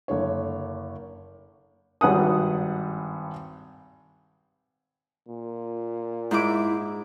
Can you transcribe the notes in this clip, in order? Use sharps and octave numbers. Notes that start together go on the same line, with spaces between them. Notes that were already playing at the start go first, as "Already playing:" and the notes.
F#1 D3 C#5
G#1 G2 F#5 D#6
A#2
G#2 E4 D6